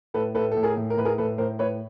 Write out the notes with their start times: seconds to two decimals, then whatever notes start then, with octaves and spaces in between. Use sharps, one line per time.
0.14 A2 A4 B4
0.35 A2 A4 B4
0.52 A2 A4
0.63 G#4 A#4
0.77 A2
0.90 A#4
0.97 A2 B4
1.05 G#4 A#4
1.18 A2 A4 B4
1.38 A2 A#4 C5
1.59 A2 B4 C#5